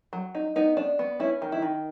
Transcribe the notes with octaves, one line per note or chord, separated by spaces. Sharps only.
F#3
D#4
B3 D#4
D4
B3
C#4 E4
D#3
E4
D#3